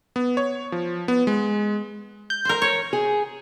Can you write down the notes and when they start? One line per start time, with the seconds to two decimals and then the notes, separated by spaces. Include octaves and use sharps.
0.16 B3
0.37 C#5
0.72 F3
1.08 B3
1.27 G#3
2.30 G6
2.45 A#4 C5
2.62 C#5
2.93 G#4